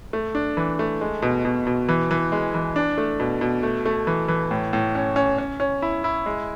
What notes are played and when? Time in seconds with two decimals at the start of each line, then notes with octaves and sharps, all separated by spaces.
0.13 A3
0.35 D4
0.57 E3
0.79 A3
1.01 G#3
1.22 B2
1.45 B2
1.67 B2
1.89 E3
2.11 E3
2.32 G#3
2.55 E3
2.76 D4
2.98 A3
3.20 B2
3.41 B2
3.63 A3
3.86 A3
4.07 E3
4.28 E3
4.51 A2
4.73 A2
4.95 C#4
5.16 C#4
5.38 C#4
5.60 C#4
5.82 E4
6.04 E4
6.26 G#3